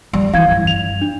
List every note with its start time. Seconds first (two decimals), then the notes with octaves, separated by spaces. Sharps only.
0.13 G3
0.34 E3 F5 G#6
0.51 G2
0.67 F7
1.01 D4